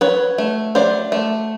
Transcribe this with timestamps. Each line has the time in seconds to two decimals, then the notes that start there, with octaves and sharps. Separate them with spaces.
0.01 F#3 B4 C#5
0.38 A3
0.75 F#3 C5 D5
1.12 A3